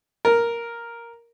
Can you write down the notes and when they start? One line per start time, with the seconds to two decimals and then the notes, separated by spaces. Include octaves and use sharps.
0.25 A#4